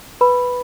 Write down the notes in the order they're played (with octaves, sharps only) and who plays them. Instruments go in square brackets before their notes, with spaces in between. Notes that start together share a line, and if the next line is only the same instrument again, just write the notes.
[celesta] B4 B5